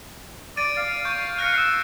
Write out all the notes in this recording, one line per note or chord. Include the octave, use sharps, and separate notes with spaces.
D5 A6 D7 D#7
F5
C#6 G6
F#6 A#6 C#7
E6